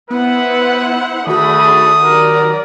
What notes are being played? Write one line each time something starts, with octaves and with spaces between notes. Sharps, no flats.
B3 E4 B4 C5 F#5
D#3 A3 D4 F#4 G#4 B5 D#6
F#3 G4 A#4 D5